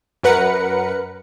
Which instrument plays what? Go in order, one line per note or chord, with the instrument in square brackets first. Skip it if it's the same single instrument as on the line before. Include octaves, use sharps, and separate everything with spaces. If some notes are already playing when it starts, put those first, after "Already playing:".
[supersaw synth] F#2 A#4 B4 F#5 C#7